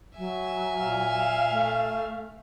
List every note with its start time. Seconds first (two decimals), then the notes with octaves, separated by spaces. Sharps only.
0.17 F#3 E5 G#5
0.80 A#2 F5
1.51 A3